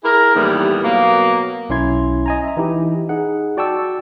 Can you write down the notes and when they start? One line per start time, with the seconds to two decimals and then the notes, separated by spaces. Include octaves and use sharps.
0.04 E4 G#4 A#4
0.35 D#2 A2 E3 G3 B3
0.83 B2 F#3 A#3
1.69 B1 C#4 E4 C6 G#6
2.26 D#5 G#5 A#5
2.44 E5 A#5
2.57 E3 D#4 E4 G4
3.09 D#4 G#4 F#5
3.57 F#4 D5 G5 A5 C#6 E6